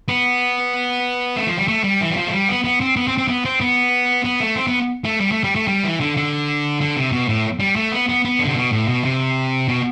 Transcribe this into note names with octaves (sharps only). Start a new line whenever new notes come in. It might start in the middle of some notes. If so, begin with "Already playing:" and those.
B3
A3
F3
G3
A3
G3
E3
G3
F3
A3
G3
B3
B3
C4
B3
C4
C4
B3
C4
B3
B3
A3
C4
B3
A3
G3
A3
G3
A3
G3
E3
D3
D3
D3
C3
B2
A2
G3
A3
B3
B3
B3
D3
C3
B2
A2
B2
C3
B2